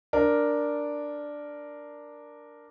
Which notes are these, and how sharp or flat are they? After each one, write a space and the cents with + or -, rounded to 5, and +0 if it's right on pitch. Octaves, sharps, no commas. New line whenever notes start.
D4 +0 A#4 +0